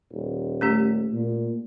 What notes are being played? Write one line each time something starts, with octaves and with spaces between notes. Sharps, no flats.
D#1
A3 C#4 G4
A#2